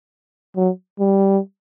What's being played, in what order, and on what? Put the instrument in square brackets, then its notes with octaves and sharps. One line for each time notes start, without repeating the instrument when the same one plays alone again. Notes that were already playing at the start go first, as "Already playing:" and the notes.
[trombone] F#3
G3